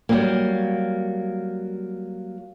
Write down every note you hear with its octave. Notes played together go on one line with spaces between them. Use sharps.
F#3 G3 A#3